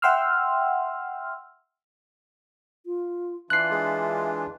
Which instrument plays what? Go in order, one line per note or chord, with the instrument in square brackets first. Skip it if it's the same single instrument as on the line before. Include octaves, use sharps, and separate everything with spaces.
[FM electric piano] E5 F#5 G5 C6 E6 F6
[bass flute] F4
[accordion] E3 D4 F4 [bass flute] E5 [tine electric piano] F#6 C7
[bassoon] G#3